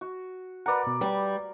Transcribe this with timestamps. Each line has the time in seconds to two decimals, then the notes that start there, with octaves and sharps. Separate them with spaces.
0.01 F#4
0.66 A#4 B4 D5 F#5 B5
0.87 B2
1.01 G3 B4